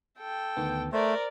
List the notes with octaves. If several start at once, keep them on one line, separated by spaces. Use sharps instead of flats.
A4 G5
D2 D#3 B3
A3 A#4 C5 D5